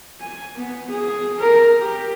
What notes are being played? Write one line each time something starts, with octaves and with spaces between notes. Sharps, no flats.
G#5
B3
G#4
A#4
G4